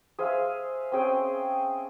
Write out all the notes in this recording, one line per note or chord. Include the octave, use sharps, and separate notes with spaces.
G#4 C5 E5 F5
C4 C#4 G#4 G5